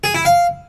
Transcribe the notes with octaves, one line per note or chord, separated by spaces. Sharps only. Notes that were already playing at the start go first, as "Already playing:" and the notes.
G#4
E4
F5